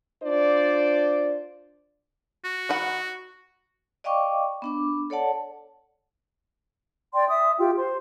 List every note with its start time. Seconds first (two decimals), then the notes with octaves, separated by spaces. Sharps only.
0.23 D4 F4 C5 D5
2.44 F#4
2.69 D#3 B4 F#5
4.04 D5 D#5 F5 G5 C#6 D6
4.62 B3 D4 D6
5.10 A4 C#5 D5 F#5 A5
7.14 D5 G5 C6
7.29 E5 D#6
7.59 F4 G4 G5
7.78 C5 C6